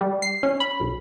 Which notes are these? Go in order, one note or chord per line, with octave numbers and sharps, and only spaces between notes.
G3
C7
C#4
B5
B1